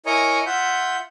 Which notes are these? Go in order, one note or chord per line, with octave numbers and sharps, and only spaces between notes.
E4 A#4 C#5 D#5 G#5 A#5
F4 E5 F#5 G6